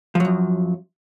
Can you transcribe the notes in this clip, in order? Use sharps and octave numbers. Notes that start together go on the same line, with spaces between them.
F#2 F3 F#3